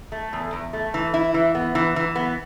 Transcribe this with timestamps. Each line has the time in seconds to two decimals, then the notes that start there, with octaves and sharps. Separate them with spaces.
0.12 A3
0.33 E2
0.53 E2
0.73 A3
0.94 E3
1.14 E4
1.34 E3
1.55 B3
1.75 E3
1.96 E3
2.15 B3